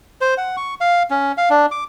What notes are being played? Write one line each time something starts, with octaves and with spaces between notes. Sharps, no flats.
C5
F#5
C#6
F5
C#4
F5
D4
D6